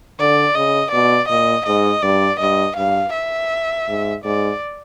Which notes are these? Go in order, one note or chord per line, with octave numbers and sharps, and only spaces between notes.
D3 D5
C#3 D#5
B2 D5
A#2 D#5
G#2 D#5
G2 D5
G2 D#5
G2 F5
E5
G#2
G#2 D5